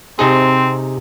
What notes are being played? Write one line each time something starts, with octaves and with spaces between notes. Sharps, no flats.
C3 C4 D#4 G#4